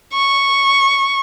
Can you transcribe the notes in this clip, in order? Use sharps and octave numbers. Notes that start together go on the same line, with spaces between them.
C#6